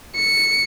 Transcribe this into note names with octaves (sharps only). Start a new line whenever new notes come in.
C#7